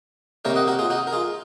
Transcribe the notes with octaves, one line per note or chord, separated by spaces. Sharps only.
C3 D#3 A#3 A#4 C#5
D#5 F#5
F#4 A#4
F4 G#4
D#4 F#4
A#4
F4 G#4